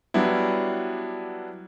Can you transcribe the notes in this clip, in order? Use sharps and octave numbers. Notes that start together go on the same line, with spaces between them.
F#3 G3 B3 D4 E4